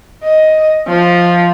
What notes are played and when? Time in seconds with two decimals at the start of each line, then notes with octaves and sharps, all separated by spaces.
0.24 D#5
0.87 F3